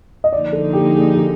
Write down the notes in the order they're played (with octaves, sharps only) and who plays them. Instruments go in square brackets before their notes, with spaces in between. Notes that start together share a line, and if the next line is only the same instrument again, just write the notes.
[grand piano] D#5
[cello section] D3 F3 A#3 D#4 [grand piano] D5
[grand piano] A4
G4
G#4
G4